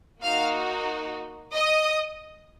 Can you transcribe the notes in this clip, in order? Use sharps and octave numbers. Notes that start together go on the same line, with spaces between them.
A#3 D#4 F#4 F5 F6
D#5 D#6